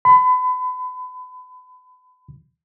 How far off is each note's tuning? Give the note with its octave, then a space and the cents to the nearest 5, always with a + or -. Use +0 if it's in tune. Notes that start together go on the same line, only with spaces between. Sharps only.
B5 +35